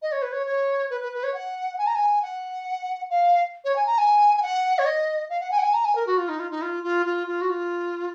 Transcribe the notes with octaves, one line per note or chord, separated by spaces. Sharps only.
D#5
C#5
B4
C#5
C#5
B4
B4
B4
C#5
F#5
G#5
A#5
G#5
F#5
F5
C#5
G#5
A#5
G#5
G#5
F#5
C#5
D#5
F5
F#5
G#5
F#5
G#5
A#5
G#5
A#4
F#4
F4
D#4
F4
D#4
F4
F4
F4
F4
F#4
F4